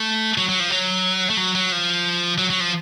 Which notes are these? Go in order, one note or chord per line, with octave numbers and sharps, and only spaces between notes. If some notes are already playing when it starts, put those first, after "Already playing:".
Already playing: A3
F#3
F#3
F3
F#3
A3
F#3
F#3
F3
F#3
F#3
F3